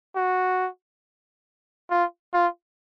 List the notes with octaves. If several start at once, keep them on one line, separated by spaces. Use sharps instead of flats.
F#4
F4
F4